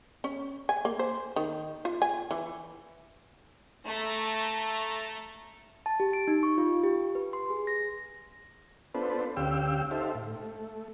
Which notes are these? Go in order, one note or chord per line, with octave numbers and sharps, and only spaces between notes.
C#4
G#5
A#3
C5
D#3
F4
G#5
E3
A3 A4 A#5
A5
G4
D7
D#4
C#6
F4
G4
B4
C6
G#4
A#6
B3 D4 F4 A4 B4 C5
D2 C#4 G4 F5 G5 E6
D#4 G4 A4 C5 E5 F5
A2
A3